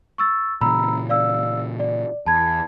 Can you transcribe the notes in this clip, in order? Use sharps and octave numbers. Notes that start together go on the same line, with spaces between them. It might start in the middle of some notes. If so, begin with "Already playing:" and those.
C#6 E6 A6
A#2 C#3 E3 A#5 B5 E6
D5 F5 E6
D5
E2 A5 B5 G#6